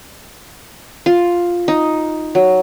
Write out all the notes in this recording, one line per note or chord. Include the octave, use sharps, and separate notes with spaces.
F4
D#4
F#3